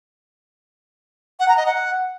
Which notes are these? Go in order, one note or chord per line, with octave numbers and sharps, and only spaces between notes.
F#5
A#5
D#5
F#5